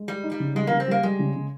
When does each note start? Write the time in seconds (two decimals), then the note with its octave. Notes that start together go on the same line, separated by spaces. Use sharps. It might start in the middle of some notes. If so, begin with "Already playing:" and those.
Already playing: G#3
0.08 G3 G4
0.24 D#4
0.32 G3
0.40 C#3
0.55 G3 G#3
0.67 C#3 A#3
0.80 C4
0.88 G3 A#3
1.03 G3 G#3
1.19 C#3
1.35 C#3